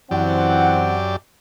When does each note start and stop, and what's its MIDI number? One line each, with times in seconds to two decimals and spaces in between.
0.11 1.16 42
0.11 0.97 52
0.11 0.97 60
0.11 1.16 67
0.11 1.16 74
0.11 0.97 78